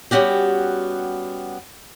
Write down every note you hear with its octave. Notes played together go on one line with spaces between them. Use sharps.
G3 B3 C#4 F#4 G4